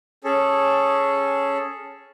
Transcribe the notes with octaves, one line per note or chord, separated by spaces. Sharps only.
C#4 G#4 A4